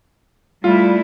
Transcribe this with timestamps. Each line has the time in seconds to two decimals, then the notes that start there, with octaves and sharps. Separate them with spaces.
0.64 G3 A3 E4 F4